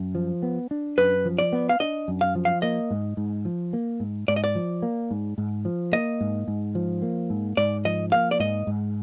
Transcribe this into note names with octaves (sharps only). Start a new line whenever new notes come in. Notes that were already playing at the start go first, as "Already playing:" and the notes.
Already playing: F#2
F3
B3
D4
F#2 B4
F3
D5
B3
F5
D4 D#5
F#2
F5
F3
F5
A#3 D#5
G#2
G#2
F3
A#3
G#2
G#2 D5
D#5
D5
F3
A#3
G#2
G#2
F3
A#3 D#5
G#2
G#2
F3
A#3
G#2
G#2 D5
F3 D#5
A#3 F5
D5
G#2 D#5
G#2